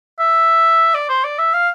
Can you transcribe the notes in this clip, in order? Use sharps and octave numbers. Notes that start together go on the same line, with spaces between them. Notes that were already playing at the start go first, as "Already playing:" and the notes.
E5
D5
C5
D5
E5
F5